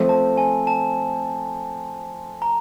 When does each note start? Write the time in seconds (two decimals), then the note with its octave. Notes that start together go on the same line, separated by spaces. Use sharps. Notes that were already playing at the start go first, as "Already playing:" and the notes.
Already playing: F3 A3 C4
0.09 A5
0.37 G#5
0.67 A5
2.42 A#5